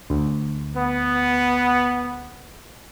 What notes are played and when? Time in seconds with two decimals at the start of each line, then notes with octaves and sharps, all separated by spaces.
0.10 D2
0.76 B3